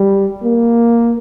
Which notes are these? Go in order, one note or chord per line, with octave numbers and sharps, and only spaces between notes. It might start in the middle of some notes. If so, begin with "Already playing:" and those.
Already playing: G3
A#3